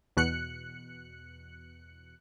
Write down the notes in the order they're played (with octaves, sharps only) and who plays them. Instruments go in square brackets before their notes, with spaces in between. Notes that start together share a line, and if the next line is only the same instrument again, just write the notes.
[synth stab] E2 B2 F#6 C#7